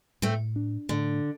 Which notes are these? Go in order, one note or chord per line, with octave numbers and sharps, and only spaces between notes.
A2 A3 C4
D4
A2 D3